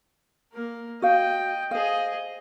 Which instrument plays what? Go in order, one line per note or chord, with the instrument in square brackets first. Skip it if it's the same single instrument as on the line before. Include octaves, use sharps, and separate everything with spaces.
[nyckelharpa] A#3 A#4
[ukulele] F#4 F5 [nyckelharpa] D#5 G5
[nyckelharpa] G#4 D#5 [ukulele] C5 F5